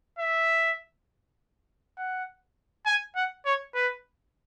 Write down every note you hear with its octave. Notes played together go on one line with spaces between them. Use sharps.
E5
F#5
G#5
F#5
C#5
B4